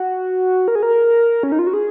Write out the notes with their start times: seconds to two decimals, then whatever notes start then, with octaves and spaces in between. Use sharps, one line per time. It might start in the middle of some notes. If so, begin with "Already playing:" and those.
Already playing: F#4
0.68 A#4
0.75 G#4
0.83 A#4
1.43 C#4
1.52 D#4
1.59 F4
1.67 F#4
1.74 G#4